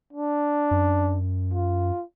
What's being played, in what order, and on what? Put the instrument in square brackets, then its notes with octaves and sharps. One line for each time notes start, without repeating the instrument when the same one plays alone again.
[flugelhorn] D4
[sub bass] F#2
[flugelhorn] F4